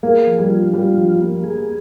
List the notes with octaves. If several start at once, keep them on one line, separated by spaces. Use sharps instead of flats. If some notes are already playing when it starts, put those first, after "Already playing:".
A#3 G#4
F3
G3
F4
G3 F4
F3
A#3
G#4